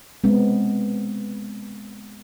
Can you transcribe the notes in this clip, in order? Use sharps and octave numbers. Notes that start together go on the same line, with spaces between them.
G#3 B3 C4